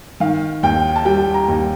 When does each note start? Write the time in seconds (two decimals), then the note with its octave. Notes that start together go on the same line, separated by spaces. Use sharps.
0.20 D#3 F5
0.63 D#2 G5
0.96 A5
1.05 G3 G5
1.34 A#5
1.48 D#2